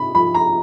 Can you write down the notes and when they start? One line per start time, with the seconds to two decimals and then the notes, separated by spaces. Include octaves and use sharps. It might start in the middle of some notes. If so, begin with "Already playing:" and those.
Already playing: C3 D#4 B5
0.15 F3 B5
0.34 A#5